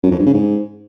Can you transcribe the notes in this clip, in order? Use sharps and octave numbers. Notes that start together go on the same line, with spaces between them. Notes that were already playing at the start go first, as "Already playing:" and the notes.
F#2
F2
G2
C#3
G#2